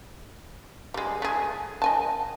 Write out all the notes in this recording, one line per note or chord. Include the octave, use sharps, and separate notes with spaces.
G3 G#3
A3 G#4
D#5 G#5 A5